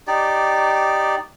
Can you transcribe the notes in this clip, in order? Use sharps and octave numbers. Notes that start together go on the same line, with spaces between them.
D#4 G4 D5